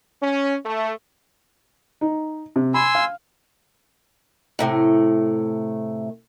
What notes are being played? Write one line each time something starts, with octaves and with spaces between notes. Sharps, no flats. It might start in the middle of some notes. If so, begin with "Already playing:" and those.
C#4
A3
D#4
C3
G#5 B5 C6 E6
F5
A2 C3 A3